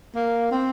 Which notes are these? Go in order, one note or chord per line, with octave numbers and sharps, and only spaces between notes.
A#3
C4